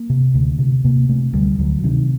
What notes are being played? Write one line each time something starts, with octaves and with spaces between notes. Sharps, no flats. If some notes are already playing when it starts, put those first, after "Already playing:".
Already playing: A#3
C3
D2
C3
C3 A#3
C3 A3
D2 G3
D2 F#3
C3 D#3